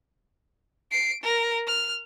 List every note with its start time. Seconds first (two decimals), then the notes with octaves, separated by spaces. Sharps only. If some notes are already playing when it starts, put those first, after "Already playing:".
0.92 C7 D7
1.23 A#4
1.67 F6